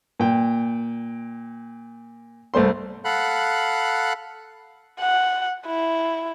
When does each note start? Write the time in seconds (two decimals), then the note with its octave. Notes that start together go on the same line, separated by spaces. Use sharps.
0.20 A#2 G5
2.54 C2 A3 C5 C6
3.05 A4 F5 F#5 B5 F#6
5.00 F#5
5.66 E4